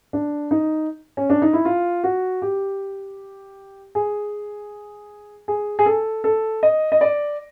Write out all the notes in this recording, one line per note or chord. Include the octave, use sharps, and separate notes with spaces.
D4
D#4
C#4
D4
D#4
E4
F4
F#4
G4
G#4
G#4
G#4
A4
A4
D#5
D#5
D5